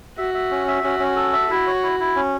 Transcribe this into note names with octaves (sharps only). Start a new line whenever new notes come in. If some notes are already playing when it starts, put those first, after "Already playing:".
F#4 E5
E5
C#4
E5
C#4 F#4
C#4
A4
E5
E4 F#4
C#5
E4
E4
C#4